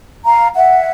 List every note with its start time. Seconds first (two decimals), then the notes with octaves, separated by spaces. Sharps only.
0.24 F5 A#5
0.56 E5 F#5